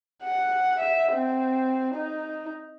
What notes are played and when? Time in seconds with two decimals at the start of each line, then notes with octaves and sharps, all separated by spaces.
0.23 F#5
0.80 E5
1.13 C4
1.95 D#4